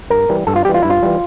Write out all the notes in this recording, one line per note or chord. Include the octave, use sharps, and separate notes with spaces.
G2 A#4
E3 G3
G2 A4
F4
E3 G3 G4
F4
G2 E4
F4
E3 G3